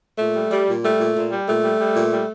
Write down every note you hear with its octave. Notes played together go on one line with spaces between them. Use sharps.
A#2 A3
G3
G3
A#2
G3 A3
A#2
A#2
G3
A#2 A3
G3
G3
A#2
G3